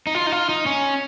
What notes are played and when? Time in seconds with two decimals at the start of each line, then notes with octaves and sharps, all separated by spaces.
0.07 D#4
0.15 F4
0.27 D#4
0.32 F4
0.49 D#4
0.66 C#4